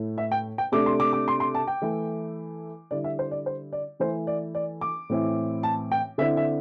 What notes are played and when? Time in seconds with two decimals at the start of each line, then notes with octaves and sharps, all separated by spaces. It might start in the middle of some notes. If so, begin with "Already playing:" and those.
Already playing: A2 A3 E4
0.18 E5
0.31 G5
0.58 G5
0.72 C3 A3 D4 D6
0.86 C6
1.00 D6
1.13 D6
1.28 C6
1.40 C6
1.55 A5
1.67 G5
1.82 E3 A3 E4
2.91 D3 G3 E4 D5
3.04 E5
3.19 C5
3.31 D5
3.46 C5
3.72 D5
4.00 E3 A3 E4 C5
4.27 D5
4.55 D5
4.81 D6
5.09 A2 E3 C4 E4
5.63 A5
5.91 G5
6.18 D3 C4 E4 E5
6.37 E5